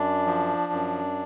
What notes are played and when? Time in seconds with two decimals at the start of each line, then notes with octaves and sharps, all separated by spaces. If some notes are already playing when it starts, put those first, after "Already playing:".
Already playing: F#2 D4
0.26 F3
0.73 F#2